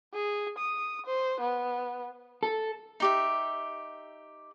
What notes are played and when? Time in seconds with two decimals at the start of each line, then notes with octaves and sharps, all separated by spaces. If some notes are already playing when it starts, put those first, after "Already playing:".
0.14 G#4
0.58 D#6
1.06 C5
1.40 B3
2.43 A4
3.00 D#4 G4 E5